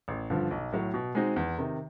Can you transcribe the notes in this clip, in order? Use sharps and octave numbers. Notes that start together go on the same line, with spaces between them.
A1
G2 D3 F3
B1
A2 F#3
B2
G#3 C4 D#4 F#4
E2
C3 D#3